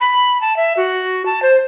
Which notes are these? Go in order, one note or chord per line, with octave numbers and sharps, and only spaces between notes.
B5
A5
E5
F#4
A5
C5